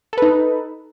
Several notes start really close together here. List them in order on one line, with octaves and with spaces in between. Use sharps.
A4 B4 D#4